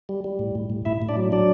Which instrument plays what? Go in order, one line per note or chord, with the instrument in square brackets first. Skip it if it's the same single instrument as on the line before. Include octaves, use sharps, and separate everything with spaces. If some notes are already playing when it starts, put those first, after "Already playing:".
[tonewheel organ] G3
G3
A2
A2
A2
A2 E4 E5
A2
D4 D5
F#3
F#3 D4 D5